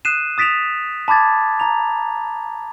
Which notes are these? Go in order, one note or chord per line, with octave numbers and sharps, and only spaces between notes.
D#6 F#6 C7 D#7 E7
D#6 A6 B6 D7 E7 F7
A5 B5 D6 G#6 A6
A#5 F7